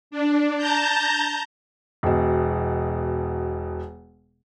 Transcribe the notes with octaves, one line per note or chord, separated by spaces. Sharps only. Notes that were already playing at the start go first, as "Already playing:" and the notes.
D4
A5 A#5 G6
E1 B2